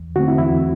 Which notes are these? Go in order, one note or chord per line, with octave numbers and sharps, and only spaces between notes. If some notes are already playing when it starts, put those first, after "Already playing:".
Already playing: E2
D3 A3 C4 F#4
E4
E2 E4